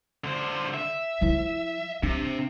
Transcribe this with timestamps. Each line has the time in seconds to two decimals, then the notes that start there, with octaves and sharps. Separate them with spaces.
0.24 D3 C5
0.74 E5
1.21 F3 E4
2.03 C3 D4